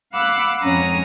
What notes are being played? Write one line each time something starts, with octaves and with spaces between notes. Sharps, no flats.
F5 F#5 B5 D6 E6 F#6
F2 G#2 C#4 C#5 A#5 D#6